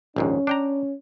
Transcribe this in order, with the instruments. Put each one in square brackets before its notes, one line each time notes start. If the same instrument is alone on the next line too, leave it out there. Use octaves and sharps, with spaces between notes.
[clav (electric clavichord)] A#1 D#2 G#2 [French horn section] C#4
[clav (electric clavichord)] D4 G5 A#5